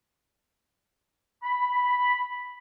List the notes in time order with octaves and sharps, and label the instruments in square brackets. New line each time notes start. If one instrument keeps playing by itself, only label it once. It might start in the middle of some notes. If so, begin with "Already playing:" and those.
[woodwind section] B5